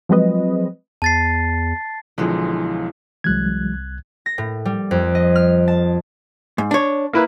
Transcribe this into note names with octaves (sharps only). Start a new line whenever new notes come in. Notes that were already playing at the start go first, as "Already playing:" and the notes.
F3 F#3 G#3 C4 B4 D#5
E2 A5 A6 C7
B1 D3 E3 F3 G#3
C2 E3 F#3 G#3 F#6 G#6
A#6
A2
G3
F2
D#5
F6
A5
G#2
D4 C#5
A#3 E4 B4